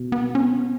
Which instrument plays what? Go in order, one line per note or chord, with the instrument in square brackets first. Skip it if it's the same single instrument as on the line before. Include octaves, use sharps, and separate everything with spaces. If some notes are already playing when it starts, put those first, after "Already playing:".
Already playing: [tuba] B2
[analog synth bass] B3
C#4
B3